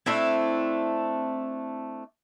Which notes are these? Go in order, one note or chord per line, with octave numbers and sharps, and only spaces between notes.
A3 C4 D4 E4